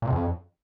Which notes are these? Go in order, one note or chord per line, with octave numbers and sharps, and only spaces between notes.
A#2
C3
F2